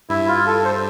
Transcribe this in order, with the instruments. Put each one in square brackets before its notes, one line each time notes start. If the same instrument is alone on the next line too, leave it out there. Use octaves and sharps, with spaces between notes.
[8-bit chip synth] G2 [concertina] E4
[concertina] F4
A4
C5